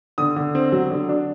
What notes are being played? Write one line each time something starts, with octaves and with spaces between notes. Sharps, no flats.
D3 D#6
D3
C4
F#3
D3
D4